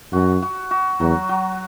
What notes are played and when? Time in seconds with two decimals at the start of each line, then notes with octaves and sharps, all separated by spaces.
0.12 F#2 F#4
0.42 F#4
0.71 F#4
1.00 E2 F#3
1.29 F#3